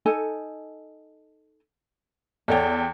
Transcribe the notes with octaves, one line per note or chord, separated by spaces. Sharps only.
D#4 A4 G#5
E2 A4 C#5 D5 F#5 G5